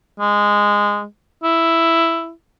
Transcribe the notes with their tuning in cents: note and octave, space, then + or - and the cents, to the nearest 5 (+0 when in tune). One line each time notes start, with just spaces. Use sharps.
G#3 -10
E4 +5